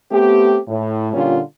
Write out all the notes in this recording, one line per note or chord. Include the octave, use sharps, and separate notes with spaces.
A3 B3 C4 G4
A2
A#2 D3 G3 C#4 F4